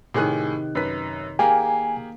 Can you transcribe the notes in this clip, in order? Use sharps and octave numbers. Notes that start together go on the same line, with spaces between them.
A2 C3 D#3 G#4 F#6
F#2 B4 B6
A#3 G4 G#4 A#4 G#5